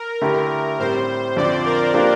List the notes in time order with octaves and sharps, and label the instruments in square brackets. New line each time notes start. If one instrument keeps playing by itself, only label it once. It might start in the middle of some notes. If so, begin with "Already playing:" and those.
Already playing: [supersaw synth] A#4
[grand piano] D3 A3 E4 G4
[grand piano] A2 G3 C4 [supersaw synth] C5
[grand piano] F2 D3 F3 [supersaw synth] D5
[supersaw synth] A#4
[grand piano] F3 A#3 D4 G4